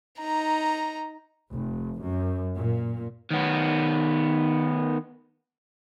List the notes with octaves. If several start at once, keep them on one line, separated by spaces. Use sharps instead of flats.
D#4 A#5
F1
F#2
A#2
D#3 B3